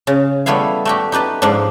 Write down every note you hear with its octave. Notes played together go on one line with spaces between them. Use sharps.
C#3
G3 A3 B3 E4 F5
A3 F#4 G4
D#4 G4 B4 A5
G#2 F3 D4